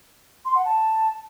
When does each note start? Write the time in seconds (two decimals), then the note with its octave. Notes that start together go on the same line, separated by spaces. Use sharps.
0.45 C6
0.55 F#5
0.65 A5